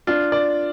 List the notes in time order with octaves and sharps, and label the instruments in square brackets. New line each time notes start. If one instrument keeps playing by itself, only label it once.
[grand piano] D4 [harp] F4
[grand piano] D5